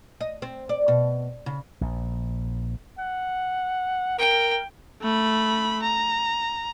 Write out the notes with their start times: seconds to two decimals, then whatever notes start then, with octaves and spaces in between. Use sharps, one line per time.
0.21 D#5
0.42 C4
0.69 D5
0.88 B2
1.46 C#3
1.81 A#1
2.99 F#5
4.19 A#4 G5
5.02 A3 B5
5.83 A#5